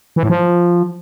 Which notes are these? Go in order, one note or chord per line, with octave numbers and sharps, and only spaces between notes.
E3
A2
F3